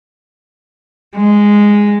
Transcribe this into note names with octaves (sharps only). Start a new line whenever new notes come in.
G#3